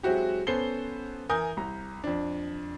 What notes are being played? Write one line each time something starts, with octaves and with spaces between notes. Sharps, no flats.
F#3 G#3 C4 E4 F#4 G4
B3 C#4 A4 C5 C7 G7
E3 A#4 G#5 D#6 G6
C2 A#5
F2 D4